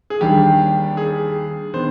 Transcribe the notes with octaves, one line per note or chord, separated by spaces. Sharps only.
G#4
D#2 D#3 G3 D4 G4
G#4
D#3 B3 D4 C5